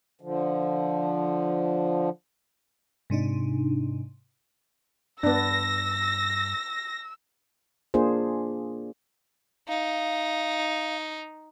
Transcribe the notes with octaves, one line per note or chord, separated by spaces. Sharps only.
D3 F3
G#2 C3 D4 D#4
G2 B3 D4 E6 A#6
A#3 D4 F4 G#4 C5
D#4 F5